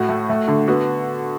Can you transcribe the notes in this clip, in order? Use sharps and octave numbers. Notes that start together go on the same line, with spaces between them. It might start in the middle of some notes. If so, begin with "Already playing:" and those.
Already playing: A2 F#4
A3
A3
D3
B3 F#4